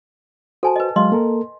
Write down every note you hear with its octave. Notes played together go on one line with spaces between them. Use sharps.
F#4 A4 C5 G#5 A5
B4 D#5
F#3 G#3 D#5 F5 C6
A#3 A4 A#4